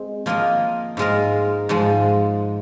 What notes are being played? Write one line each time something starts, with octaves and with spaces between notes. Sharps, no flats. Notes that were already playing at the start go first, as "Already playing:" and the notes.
Already playing: G#3 C4
F3 A#3 F4 A#4 D#5
G#2 G#3 F4 A#4
G#2 F3 G#3